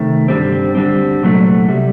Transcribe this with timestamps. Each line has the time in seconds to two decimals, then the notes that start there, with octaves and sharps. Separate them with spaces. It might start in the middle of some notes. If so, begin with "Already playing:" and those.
Already playing: C3 D#3 A3
0.28 G2 D3 G3 C4
0.75 D2 D3 G3 C4
1.22 C2 A#2 F#3 A3
1.69 C3 G3